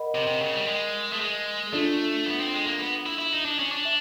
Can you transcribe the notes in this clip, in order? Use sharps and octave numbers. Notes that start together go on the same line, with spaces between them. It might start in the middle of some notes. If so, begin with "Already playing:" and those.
Already playing: A#4 D#5 F#5 B5
C3
C3
C#3
G3
G#3
A3
G#3
A3 D4 F4 A4 D5
B3
C4
G#3
A#3
B3
E4
E4
D#4
D4
C#4
D4
E5